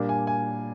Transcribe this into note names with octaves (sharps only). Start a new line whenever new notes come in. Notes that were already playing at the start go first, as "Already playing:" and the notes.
Already playing: A#2 G3 A#3 D4
G#5
G#5